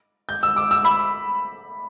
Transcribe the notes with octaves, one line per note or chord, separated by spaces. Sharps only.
G6
E6
D6
E6
B5